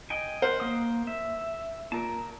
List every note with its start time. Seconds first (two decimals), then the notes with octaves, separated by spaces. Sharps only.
0.10 D#5 G5 G#5
0.42 A#4 C5 F#5
0.60 A#3 D#6
1.07 E5
1.92 A#2 A#4 A5